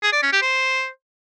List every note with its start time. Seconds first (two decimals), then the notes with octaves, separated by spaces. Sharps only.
0.03 G#4
0.13 D5
0.23 C#4
0.32 G4
0.42 C5